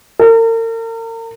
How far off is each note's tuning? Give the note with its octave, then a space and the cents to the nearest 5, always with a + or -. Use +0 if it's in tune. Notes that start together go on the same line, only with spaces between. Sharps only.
A#4 -40